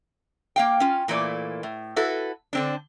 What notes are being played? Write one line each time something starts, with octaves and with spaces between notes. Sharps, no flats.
A#3 F5 G5
C#4 F4
A#2 E3 A3 A#3 D5
A2
E4 F#4 A4 B4
D3 C4 D4